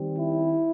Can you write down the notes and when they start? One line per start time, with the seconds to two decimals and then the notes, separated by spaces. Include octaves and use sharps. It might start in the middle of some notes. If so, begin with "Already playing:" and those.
Already playing: D#3 G3 C4
0.17 E4